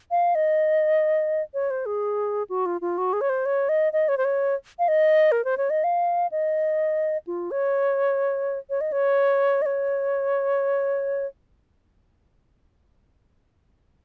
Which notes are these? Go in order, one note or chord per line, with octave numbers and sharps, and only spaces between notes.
F5
D#5
C#5
C5
G#4
F#4
F4
F4
F#4
G#4
C#5
C5
C#5
D#5
D#5
C#5
C5
C#5
F5
D#5
A#4
C5
C#5
D#5
F5
D#5
F4
C#5
C#5
D#5
C#5
D#5
C#5